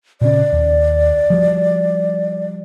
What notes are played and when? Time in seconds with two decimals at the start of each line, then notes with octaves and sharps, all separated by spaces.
0.21 A#2 C#3 C#4 D5
0.53 D#2
1.30 F3 G3